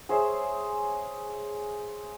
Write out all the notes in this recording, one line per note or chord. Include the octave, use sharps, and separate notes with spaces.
G#4 C5 C#5 E5